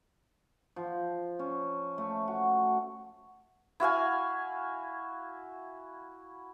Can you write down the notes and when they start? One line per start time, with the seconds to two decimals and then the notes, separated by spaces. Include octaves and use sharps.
0.76 F3
1.39 C#4
1.98 A3
2.28 F#4
3.80 E4 F#4 F5 G#5